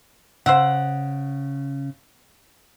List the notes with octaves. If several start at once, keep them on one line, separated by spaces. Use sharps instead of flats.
C#3 C5 E5 F#5